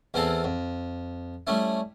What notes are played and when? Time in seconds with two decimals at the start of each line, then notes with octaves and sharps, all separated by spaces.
0.14 E2 E3 C4 E4 A4 F5
0.44 F2
1.47 G3 A3 C#4 E4